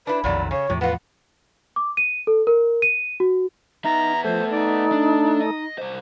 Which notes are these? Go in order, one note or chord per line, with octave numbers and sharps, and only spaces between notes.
D4 E4 B4 B5
B1 F2 A#2 D#3 F#3 A3 D5
C#3 C#5 C#6
E2 A2 C3 F3
B3 F4 B4 F#5
D6
D#7
A4
A#4
D#7
F#4
B3 D#4 E5 A#5
F3 A3 A4 C5
D#4 D5
D4
D#5
C2 C5